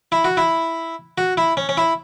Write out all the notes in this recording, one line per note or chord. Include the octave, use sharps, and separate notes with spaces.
E4
F#4
E4
F#4
E4
C#4
C#4
E4